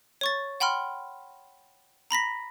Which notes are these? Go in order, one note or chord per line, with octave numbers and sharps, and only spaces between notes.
C#5 C#6 A6
F#5 G5 B5 C6 F6
A#5 B5 A#6 B6